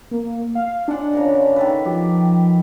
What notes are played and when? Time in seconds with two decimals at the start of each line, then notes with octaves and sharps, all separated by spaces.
0.11 A#3
0.55 F5
0.88 G#3 D4 F#5
1.13 C#3 F3 A#4
1.56 D#3 A4 B4
1.85 F3 G4